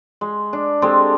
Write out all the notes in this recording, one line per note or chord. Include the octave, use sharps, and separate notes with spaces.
G#3
D4
G#3 C4 G4 A4